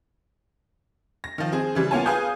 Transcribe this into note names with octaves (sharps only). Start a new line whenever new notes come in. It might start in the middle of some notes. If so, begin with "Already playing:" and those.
A#6
D#3 F3
C4 G#4
C#3 E3 G3
A#3 B3 F4 C#5 G#5 A5
G#4 B4 F5 G#5 D#6 G6